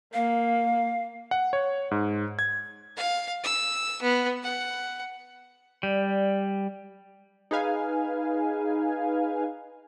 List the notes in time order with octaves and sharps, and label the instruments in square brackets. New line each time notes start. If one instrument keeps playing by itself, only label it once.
[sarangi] A#3 [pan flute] F5
[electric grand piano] F#5
C#5
G#2
G#6
[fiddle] F5
E6
B3
F#5
[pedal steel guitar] G3 [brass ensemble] D5
[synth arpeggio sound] D#4 G#4 B4 F5 G#5